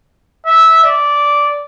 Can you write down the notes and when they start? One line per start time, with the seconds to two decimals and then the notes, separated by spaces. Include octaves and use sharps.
0.47 E5
0.84 D5